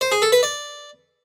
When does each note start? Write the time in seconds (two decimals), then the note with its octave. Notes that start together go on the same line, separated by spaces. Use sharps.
0.01 C5
0.12 G#4
0.22 A4
0.32 B4
0.43 D5